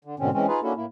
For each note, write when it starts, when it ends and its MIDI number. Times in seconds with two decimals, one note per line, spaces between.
0.05 0.15 50
0.20 0.30 44
0.20 0.30 47
0.20 0.30 50
0.20 0.30 60
0.20 0.30 61
0.33 0.46 52
0.33 0.46 56
0.33 0.46 60
0.33 0.46 61
0.48 0.60 63
0.48 0.60 65
0.48 0.60 68
0.48 0.60 71
0.63 0.73 58
0.63 0.73 61
0.63 0.73 62
0.63 0.73 64
0.63 0.73 66
0.63 0.73 69
0.76 0.85 45
0.76 0.85 58
0.76 0.85 64